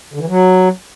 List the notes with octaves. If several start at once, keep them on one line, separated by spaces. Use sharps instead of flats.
D3
E3
F#3